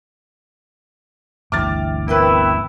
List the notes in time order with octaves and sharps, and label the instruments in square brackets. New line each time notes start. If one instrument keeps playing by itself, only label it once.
[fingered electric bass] G1 D2 E3 [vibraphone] E5 G5 [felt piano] D6 F6 A6
[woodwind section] A3 C4 E4 [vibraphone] B3 G5 E6 [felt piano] A#4 B4